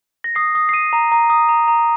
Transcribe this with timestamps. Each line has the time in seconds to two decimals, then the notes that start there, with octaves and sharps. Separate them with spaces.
0.24 A#6
0.35 D#6 C7
0.55 D#6
0.69 C7
0.73 D#6 D#7
0.93 A#5
1.12 A#5
1.30 D#6
1.49 A#5
1.68 A#5